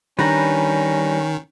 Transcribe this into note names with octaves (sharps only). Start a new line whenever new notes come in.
D#3 G3 C#4 D4 B4 A#5